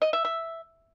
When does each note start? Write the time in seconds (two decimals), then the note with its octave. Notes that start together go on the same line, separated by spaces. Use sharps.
0.02 D#5
0.13 E5
0.25 E5